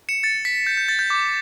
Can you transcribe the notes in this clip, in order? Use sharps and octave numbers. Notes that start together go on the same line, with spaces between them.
C#7 E7
A6 C#7
B6
G6
G6
A6
G6
D6